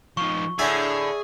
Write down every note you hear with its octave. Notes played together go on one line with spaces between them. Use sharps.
F3 D#4 C#6
A2 D3 G#4 D5 E5 G#5